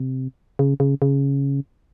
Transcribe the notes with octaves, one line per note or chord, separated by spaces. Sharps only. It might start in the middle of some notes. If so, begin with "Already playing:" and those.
Already playing: C3
C#3
C#3
C#3